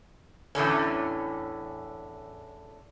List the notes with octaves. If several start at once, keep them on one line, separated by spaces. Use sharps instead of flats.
E2 A2 D3 C#4